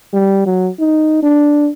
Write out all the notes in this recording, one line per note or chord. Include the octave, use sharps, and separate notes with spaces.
G3
F#3
D#4
D4